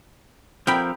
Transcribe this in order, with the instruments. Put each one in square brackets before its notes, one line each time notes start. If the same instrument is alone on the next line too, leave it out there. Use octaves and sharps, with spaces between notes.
[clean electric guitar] F3 C4 A#4 [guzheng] G5 B5